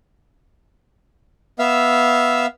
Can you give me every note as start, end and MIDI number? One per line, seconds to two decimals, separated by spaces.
1.59 2.46 59
1.59 2.46 76
1.59 2.46 77
1.59 2.46 88